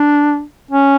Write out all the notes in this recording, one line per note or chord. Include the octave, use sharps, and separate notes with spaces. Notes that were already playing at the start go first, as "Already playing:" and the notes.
Already playing: D4
C#4